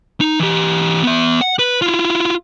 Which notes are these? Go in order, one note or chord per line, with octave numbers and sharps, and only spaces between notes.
D#4
E3 G4
B3 E5
F#5
B4
E4 F4